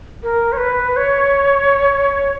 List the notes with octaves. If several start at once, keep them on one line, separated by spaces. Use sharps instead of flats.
A#4
C#5
B4
C#5